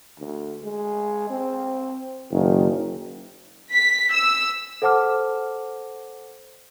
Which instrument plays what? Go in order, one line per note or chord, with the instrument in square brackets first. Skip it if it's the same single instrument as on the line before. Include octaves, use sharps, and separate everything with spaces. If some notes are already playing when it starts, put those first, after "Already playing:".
[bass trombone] D2
G#3
C4
[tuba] F#1 [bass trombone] D#3
[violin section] B6
E6
[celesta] A4 C5 F#5 A5 D6 F6